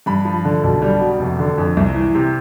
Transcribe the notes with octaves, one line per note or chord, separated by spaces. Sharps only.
G2 B5
F3
D3
B1
G3
B2
F1
D3
F2
C2
E3
C3